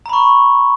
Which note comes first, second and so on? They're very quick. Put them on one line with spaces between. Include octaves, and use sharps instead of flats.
A#5 B5 C#6